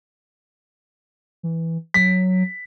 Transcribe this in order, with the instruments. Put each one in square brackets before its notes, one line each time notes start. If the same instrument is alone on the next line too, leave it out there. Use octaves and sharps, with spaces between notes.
[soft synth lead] E3
[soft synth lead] F#3 [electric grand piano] B6